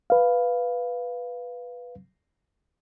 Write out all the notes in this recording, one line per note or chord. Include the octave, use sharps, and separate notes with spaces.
B4 F5